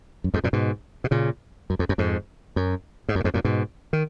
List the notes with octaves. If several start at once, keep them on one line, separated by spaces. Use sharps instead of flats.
F#2
F2 G#2
F#2 A#2
G#2 B2
B2
A#2 C#3
F#2
F2
F#2
F2 G#2
F#2
G#2
F#2
A#2
F2 G#2
F#2 A#2
G#2 B2
D#3